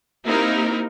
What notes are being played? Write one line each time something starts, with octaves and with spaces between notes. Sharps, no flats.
A#3 C4 D#4 E4 G4 A#4